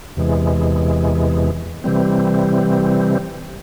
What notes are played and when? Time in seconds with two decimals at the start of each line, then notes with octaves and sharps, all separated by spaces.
0.17 E2 C3 E3 G#3
1.84 C3 E3 G3 C4